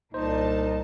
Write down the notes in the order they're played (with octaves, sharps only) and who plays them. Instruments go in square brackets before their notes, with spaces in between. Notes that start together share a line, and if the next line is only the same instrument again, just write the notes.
[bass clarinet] C2 [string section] A#2 D4 A5 [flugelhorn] D#4 [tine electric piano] C5